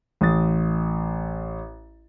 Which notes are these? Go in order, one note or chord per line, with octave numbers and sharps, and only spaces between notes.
A1 D#6 A6